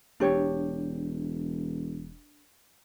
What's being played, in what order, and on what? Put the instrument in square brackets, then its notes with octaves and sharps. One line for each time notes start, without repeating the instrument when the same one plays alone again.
[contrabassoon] E1 [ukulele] D4 G4 C#5